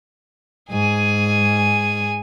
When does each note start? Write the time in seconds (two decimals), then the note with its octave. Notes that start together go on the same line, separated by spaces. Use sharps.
0.70 G#2 G#4 G#5